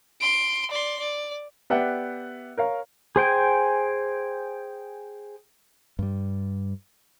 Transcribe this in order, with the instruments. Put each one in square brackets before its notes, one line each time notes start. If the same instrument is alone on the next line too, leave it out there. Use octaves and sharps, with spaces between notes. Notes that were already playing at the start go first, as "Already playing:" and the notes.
[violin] C6 D7
D5 C6
D5
[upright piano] B3 G4 D5 E5 F#5 G5
A#4 C#5 F5
[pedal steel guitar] G#4 C5 G5 G#5
[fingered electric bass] G2 G3